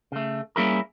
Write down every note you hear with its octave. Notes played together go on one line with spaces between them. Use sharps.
C#3 A3
G3 A#3 C#4 E4 G#4 A#4